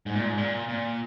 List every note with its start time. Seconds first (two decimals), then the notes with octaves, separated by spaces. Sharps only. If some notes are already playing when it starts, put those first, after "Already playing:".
0.06 G#2
0.15 A#2
0.25 G#2
0.37 A#2
0.68 A#2